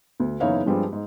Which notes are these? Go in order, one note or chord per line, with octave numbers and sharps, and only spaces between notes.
D2
F#1 E2 D#4 E4 C#5 F5
G2 F3 G3 G#3 C4 D4
G#2